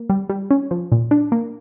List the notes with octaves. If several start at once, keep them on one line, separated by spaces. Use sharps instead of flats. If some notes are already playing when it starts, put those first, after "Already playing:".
Already playing: A#3
G3
G3
C#4
F3
A#2
D4
A#3